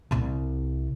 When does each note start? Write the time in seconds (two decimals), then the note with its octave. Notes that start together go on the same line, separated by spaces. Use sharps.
0.11 C2 C3